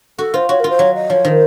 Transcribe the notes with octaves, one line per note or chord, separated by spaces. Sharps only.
F#4 A4
F4 C5
F#4 C#5
A#4
F4
C5
F#3 C#5
D#5
F3 C#5
D#3 C5